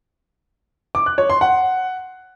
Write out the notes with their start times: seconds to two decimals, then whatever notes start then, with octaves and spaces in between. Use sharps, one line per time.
0.95 D6
1.06 F#6
1.18 C#5
1.30 C6
1.41 F#5